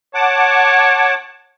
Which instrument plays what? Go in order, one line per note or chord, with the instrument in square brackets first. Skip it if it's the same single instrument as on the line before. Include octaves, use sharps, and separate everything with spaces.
[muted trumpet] C#5 [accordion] F#5 A5 D6